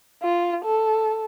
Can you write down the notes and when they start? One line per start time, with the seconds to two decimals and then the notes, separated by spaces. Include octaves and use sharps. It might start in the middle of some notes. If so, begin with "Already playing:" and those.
0.23 F4
0.65 A4